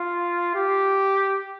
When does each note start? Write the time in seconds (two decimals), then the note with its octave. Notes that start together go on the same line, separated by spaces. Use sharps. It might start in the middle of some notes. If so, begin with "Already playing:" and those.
Already playing: F4
0.55 G4